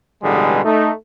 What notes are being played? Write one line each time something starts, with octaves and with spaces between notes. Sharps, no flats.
A1 B2 D3 G3 G#3 G#4
A3 D#4